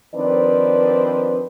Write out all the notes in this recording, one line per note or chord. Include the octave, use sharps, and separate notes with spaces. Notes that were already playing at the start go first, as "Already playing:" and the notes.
D#3 F3 C4 D4 B4 D5